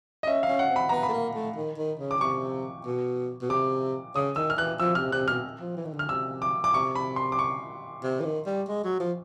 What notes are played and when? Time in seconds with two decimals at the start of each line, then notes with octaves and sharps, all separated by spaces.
0.23 D#5
0.26 C#4 E5
0.43 F5
0.48 C#4
0.59 F#5
0.70 C4
0.76 B5
0.89 B3 A#5
1.03 B5
1.08 A3
1.13 A#3
1.35 A3
1.56 D#3
1.78 D#3
1.99 C#3
2.11 D6
2.20 C3 C#6
2.86 B2
3.42 B2
3.50 C3 D6
4.15 C#3 D#6
4.36 D#3 E6
4.50 F6
4.58 E3 F#6
4.80 F3 E6
4.95 C3 F6
5.12 C3 F#6
5.28 B2 F6
5.61 F3
5.77 E3
5.85 D#3
5.93 D3
5.99 F6
6.09 C3 E6
6.42 D6
6.64 D6
6.74 C3 C#6
6.95 B5
7.16 C6
7.32 D6
7.39 C#6
8.03 C3
8.20 E3
8.24 D#3
8.46 G3
8.68 G#3
8.84 F#3
9.00 F3